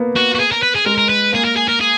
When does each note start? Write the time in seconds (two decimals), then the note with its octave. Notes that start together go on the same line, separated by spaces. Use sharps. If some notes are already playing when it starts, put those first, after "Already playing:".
Already playing: A#3 B3
0.16 F#4
0.35 F#4
0.40 G#4
0.52 A#4
0.63 B4
0.75 G#4
0.86 G#3 A#4
0.97 A#4
1.09 B4
1.33 A#3 G#4
1.45 A#4
1.56 G#4
1.68 A#4
1.81 G#4